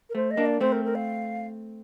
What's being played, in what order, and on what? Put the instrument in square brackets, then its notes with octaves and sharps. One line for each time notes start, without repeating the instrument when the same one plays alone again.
[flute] A#4
[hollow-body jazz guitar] A3 [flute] C5
[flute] D#5
[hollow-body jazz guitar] A#3 D4
[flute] D5
[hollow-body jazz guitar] A3 C4 [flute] C5
[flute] A#4
A#4
F5